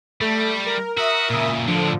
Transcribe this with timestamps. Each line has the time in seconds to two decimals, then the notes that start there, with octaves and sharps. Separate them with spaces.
0.21 G3 A3
0.66 A#4
0.97 F#4 A#4 E5 D#6
1.30 A#2 C#3
1.67 A2 D3 F3 D4